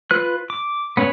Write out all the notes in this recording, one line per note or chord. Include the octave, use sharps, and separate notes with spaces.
F4 B4 F#6
D6
B3 C#4 B4 C#5